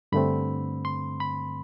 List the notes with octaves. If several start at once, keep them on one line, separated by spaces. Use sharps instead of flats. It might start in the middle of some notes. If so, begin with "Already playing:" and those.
G2 D3 A3 C4 B5
C6
B5